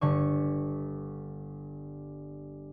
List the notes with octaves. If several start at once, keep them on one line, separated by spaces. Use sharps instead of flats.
G1 D3 C#6